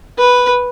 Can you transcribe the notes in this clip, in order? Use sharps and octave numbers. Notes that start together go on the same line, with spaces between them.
B4